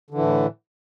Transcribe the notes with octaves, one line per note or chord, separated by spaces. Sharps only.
A2 D3 E3